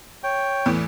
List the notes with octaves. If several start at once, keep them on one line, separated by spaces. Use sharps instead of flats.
C#5 G5
E2 A2 E3